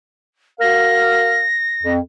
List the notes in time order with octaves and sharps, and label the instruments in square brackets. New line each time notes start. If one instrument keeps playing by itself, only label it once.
[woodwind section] F#4 A#4 F5 [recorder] A#6
[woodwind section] F2